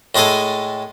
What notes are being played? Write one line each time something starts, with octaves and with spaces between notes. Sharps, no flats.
A2 G#3 G#4 A4 G#5